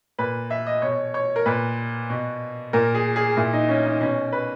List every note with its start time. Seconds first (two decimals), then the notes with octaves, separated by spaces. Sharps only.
0.18 A#2 B4
0.50 E5
0.66 D#5
0.82 B2 C#5
1.14 C#5
1.36 A#4
1.46 A#2 B4
2.10 B2
2.73 A#2 A#4
2.94 G#4
3.16 G#4
3.37 A#2 E4
3.53 D#4
3.69 C#4
3.85 D#4
4.00 B2 C#4
4.32 B4